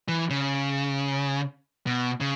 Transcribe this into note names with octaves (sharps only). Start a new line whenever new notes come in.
E3
C#3
B2
C#3